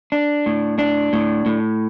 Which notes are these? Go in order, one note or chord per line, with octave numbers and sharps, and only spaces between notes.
D4
A2
D4
A2
A2